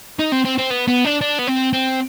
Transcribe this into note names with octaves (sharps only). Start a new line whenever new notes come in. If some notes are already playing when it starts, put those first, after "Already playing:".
D#4
C4
C4
C4
B3
B3
D4
D4
B3
C4
C4